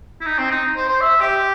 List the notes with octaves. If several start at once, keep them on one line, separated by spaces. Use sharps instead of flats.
E4
D#4
C4
D#4
C5
C5
E5
G4